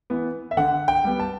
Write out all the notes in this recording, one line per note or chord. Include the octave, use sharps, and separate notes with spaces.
E3 B3
E5
D3 F#5
G5
G3 B3
A5